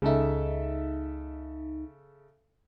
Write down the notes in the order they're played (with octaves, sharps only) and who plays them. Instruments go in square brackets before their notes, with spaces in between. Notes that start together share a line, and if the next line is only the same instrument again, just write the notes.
[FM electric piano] C#2 D#4 [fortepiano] C#3 A4 E5